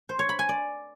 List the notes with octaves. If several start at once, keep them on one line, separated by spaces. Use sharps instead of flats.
C5
C#5
B5
G#5
D5